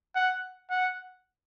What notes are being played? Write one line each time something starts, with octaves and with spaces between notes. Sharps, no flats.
F#5
F#5